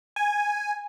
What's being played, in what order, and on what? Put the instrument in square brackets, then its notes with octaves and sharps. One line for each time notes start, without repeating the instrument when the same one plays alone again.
[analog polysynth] G#5